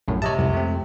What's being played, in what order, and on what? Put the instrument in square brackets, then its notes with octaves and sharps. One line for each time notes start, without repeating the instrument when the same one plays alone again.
[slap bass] A#1 [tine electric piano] F#2 A2
[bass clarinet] C3 [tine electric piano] C#5 D#5 A5
[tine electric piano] C2 [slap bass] F2 G#3
[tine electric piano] A3 C4